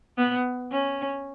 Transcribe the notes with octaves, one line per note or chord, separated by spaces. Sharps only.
B3
C#4